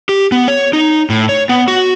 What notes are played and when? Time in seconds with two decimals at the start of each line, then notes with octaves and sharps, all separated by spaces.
0.09 G4
0.32 B3
0.48 C#5
0.73 D#4
1.10 A2
1.29 C#5
1.49 B3
1.68 F#4